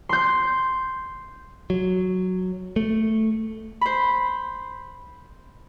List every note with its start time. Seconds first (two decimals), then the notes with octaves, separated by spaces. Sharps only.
0.09 C6 G6
1.70 F#3
2.76 A3
3.81 C5 B5